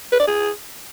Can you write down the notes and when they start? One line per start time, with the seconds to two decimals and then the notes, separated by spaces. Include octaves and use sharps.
0.12 B4
0.20 D5
0.27 G#4